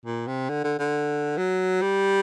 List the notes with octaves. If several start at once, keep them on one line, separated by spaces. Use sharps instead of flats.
A#2
C3
D3
D3
D3
F#3
G3